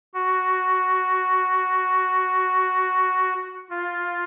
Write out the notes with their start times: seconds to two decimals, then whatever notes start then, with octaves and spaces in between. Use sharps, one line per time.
0.14 F#4
3.70 F4